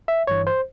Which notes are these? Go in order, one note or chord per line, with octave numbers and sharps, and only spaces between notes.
E5
G1 G2 E3 C#5
C5